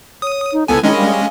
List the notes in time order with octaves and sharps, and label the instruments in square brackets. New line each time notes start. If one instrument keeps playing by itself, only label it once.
[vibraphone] C#5 [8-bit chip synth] D#6
[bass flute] D#4
[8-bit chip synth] C#2 B3 G#5 [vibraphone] E4 [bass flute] A4
[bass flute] D#3 [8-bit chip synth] G#3 C#4 D#5 [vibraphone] D4 A#4 B5
[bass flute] G3 [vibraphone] F5 G#5